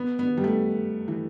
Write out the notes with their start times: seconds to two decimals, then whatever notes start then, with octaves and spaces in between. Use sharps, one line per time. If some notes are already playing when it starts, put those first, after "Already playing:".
Already playing: B3
0.19 B3
0.37 G3
0.44 A3
1.08 E3